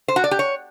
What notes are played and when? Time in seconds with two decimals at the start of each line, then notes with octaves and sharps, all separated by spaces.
0.08 C5
0.16 F#4
0.24 D5
0.31 G4
0.39 C#5